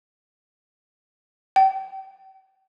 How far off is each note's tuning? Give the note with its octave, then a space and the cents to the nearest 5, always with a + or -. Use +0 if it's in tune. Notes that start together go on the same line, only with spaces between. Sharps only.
G5 -30